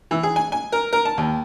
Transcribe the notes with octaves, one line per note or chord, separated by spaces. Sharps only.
E3
G#4
G#5
G#5
A#4
A#4
A5
D#2